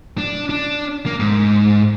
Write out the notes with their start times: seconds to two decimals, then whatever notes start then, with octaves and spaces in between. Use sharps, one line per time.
0.18 D4
0.49 D4
1.06 A#3
1.19 G#2